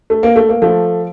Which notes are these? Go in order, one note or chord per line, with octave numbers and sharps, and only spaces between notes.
A3
A#3
A3
A#3
F3 A3